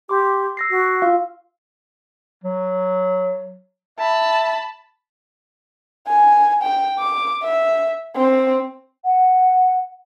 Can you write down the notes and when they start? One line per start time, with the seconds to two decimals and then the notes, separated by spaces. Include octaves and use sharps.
0.09 G4 C6 D6
0.57 E6 A#6 C7
0.70 F#4
1.02 F4 F5 E6
2.44 F#3
3.99 E5 A5 B5
6.07 G#5
6.62 G5
6.99 D6
7.43 E5
8.16 C4
9.05 F#5